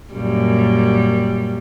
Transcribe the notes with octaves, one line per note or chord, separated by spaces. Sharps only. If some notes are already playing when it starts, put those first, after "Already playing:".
F#2 A#2 G3